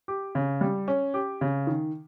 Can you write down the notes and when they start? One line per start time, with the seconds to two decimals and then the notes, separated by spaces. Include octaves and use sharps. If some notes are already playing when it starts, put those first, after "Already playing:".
0.08 G4
0.35 C#3
0.61 G3
0.88 C#4
1.14 G4
1.41 C#3
1.67 D#3